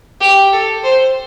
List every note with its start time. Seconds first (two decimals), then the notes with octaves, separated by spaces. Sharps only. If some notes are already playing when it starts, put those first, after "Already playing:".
0.21 G4
0.52 A4
0.83 C5